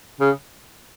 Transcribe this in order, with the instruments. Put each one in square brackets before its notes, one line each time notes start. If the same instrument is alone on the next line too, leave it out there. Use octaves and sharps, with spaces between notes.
[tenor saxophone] C#3